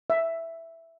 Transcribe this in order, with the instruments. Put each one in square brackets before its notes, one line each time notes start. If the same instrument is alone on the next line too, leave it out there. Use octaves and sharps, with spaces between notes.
[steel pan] E5